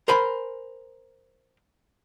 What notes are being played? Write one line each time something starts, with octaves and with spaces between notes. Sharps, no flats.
A#4 C5 G#5 B5